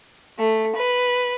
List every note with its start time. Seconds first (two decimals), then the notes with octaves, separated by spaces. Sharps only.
0.39 A3
0.76 B4